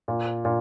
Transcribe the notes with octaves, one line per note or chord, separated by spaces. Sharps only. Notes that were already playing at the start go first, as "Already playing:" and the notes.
A#2
A#2